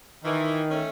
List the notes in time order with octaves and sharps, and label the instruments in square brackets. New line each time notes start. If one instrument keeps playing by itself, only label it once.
[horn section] D#3 [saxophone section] E3
[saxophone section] A3 C#4